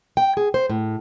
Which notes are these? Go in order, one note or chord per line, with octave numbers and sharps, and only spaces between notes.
G5
G#4
C5
A2